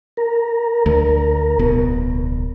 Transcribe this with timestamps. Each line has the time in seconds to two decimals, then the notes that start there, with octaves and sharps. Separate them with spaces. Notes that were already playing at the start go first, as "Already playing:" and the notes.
0.17 A#4
0.86 D2
1.59 D1 B1 B2